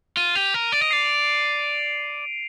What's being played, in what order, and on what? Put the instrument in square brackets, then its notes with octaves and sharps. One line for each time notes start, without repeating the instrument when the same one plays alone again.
[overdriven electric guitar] F4 [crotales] D#7
[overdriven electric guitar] G4 [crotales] F7
[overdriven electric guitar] A#4
[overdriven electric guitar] D5 [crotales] D7
[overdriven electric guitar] D#5
[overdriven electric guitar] D5 [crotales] C7